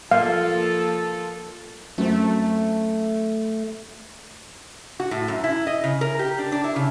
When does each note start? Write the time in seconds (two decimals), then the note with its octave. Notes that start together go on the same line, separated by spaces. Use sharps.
0.11 F3 A#3 F4 A4 F5
1.98 F#2 F#3 A3 C4
5.00 F#4
5.11 A2
5.28 F#2
5.44 E4
5.67 D#5
5.84 C#3
6.01 A#4
6.19 G4
6.38 D4
6.52 D4
6.64 E4
6.76 C#3